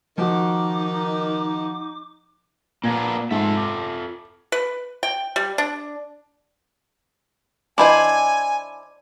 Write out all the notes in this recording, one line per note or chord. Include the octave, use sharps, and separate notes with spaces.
D#3 F3 D#4 F#4 D6
A#2 A#3 B3 D4 G#6
G#2 F4 A4 E5
D6
B4
G5
G3
D4
D4 E4 C5 D#5 G#5 B5 D6